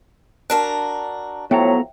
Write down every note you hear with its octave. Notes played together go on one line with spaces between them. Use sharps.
D4 F#4 A#4 A5 F#6
A2 F3 F#3 B3 A4 E5 G5 A#5